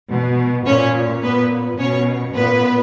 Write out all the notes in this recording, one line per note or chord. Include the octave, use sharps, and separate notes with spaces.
B2
A#2 C#4 C#5
A#2 B3 B4
B2 C#4 C#5
A#2 B3 B4